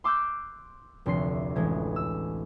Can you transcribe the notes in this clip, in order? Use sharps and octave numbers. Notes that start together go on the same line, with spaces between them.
C6 D6 E6 F#6 G6
F1 D2 C6 C7
A1 G#3 G#6
E6